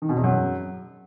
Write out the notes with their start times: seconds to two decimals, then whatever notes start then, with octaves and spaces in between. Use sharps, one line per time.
0.02 D#3
0.09 B2
0.16 E2
0.24 F#2